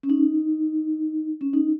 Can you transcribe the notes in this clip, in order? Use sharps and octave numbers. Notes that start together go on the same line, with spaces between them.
C#4
D#4
C#4
D#4